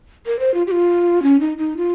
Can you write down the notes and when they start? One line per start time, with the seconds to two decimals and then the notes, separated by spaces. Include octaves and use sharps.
0.26 A#4
0.39 C5
0.54 F4
0.67 G4
0.71 F4
1.23 C#4
1.40 D#4
1.58 D#4
1.77 F4